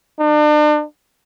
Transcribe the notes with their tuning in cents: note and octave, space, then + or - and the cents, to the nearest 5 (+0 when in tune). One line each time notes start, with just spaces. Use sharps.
D4 +40